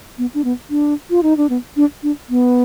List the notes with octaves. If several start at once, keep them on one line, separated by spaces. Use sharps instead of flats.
B3
D4
B3
D4
F4
D#4
D4
B3
D4
D4
B3